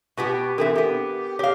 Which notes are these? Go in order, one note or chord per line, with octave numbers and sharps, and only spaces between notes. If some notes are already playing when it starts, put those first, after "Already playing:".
B2 B3 F4 G4 C#6
E3 C4 D4 E4 A4 A#4
B3 G4
G4 C#5 F5 D6